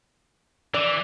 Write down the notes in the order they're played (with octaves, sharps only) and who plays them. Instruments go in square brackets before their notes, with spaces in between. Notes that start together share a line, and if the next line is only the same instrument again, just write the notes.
[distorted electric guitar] E3 [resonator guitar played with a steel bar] D5